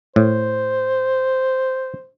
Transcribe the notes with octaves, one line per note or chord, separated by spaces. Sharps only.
A2 C5